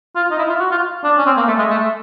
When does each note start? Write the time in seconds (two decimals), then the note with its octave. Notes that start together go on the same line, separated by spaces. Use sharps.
0.16 F4
0.31 D#4
0.38 E4
0.49 F4
0.60 F#4
0.71 F4
1.04 D4
1.17 C#4
1.26 C4
1.37 A#3
1.47 A3
1.58 G#3
1.70 A3